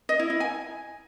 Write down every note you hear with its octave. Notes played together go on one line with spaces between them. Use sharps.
D#5
E4
E4
G#5